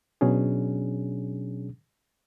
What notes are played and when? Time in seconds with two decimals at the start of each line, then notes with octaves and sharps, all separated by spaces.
0.21 B2 F#3 C#4 D4 G#4